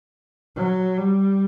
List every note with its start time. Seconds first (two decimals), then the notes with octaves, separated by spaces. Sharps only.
0.56 F#3
0.98 G3